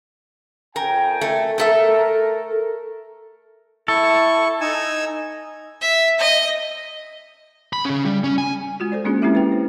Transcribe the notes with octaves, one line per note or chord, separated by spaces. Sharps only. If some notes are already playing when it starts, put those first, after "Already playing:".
F2 A#4 G5 G#5
A3
A3 A4 A#4 E5
E4 A4 C#6
D#4 G#5 E6
E5
D#5
B5
C#3 C#4
G3
C#4
G#5
G#3 F4 F#4
A4 C5 D5
G#3 A#3 C#4 D4 F4 G#4
G#3 C4 C#4 E4 G4 E5
B4 G5
B4 C5